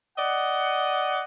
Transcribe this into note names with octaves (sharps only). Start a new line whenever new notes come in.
D5 D#5 F#5